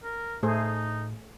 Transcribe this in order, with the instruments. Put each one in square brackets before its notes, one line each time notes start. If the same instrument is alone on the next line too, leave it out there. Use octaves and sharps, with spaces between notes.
[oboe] A#4
[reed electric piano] A2 [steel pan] A3 G#4 C5 [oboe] D#4